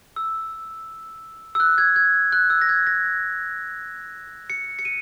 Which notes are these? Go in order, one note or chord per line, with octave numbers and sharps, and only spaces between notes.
E6
E6
F#6
G#6
G#6
F#6
E6
A#6
G#6
A#6
C#7
C#7
D#7